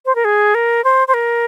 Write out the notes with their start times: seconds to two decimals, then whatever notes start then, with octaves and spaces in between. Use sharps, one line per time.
0.06 C5
0.15 A#4
0.25 G#4
0.55 A#4
0.84 C5
1.08 C5
1.14 A#4